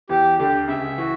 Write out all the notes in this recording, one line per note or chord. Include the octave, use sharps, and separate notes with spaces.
E2 E3 G4
D2 D3 G4
C#2 C#3 E5
E3 F#4